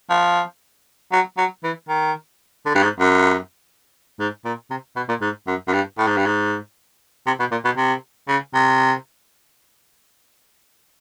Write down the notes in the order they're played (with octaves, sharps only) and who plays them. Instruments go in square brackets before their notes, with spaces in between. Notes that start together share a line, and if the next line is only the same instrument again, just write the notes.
[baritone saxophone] F3
F#3
F#3
E3
D#3
D3
G2
G#2
F#2
G#2
A#2
C3
B2
A#2
G#2
F#2
F#2
G2
A2
G#2
G2
G#2
C3
B2
A#2
B2
C3
C#3
C3